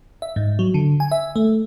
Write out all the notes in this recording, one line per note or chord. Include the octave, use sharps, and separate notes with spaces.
E5
G#2
F#3
D3
G#5
E5
A3